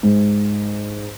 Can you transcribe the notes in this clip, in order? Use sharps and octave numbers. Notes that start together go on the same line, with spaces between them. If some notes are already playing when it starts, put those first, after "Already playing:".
G#2